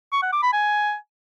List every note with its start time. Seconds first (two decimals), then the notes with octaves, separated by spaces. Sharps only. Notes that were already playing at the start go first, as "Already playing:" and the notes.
0.12 C#6
0.22 F#5
0.33 D6
0.43 B5
0.53 G#5